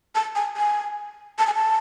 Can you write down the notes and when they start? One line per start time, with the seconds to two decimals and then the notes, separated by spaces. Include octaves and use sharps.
0.15 A5
0.35 G#5
0.57 G#5
1.39 A5
1.47 G#5
1.55 A5